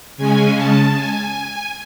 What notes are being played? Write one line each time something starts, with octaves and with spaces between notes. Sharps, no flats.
C#3 G#3 C#4 G#5
A5
G#5